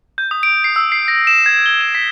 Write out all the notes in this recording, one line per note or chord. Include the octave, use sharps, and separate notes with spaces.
G6
D#6
D7
C7
E6
C7
A#6
E7
G#6
G7
E7
B6